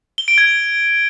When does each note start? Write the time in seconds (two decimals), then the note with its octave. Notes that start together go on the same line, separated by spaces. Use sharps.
0.18 G7
0.28 D7
0.38 G#6